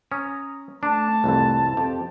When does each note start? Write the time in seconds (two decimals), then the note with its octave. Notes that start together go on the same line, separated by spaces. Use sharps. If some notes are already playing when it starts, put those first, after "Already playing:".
0.12 C#4 A#5 D#6
0.83 A3 D4 A5
1.24 C2 F2 E3
1.77 F2 G4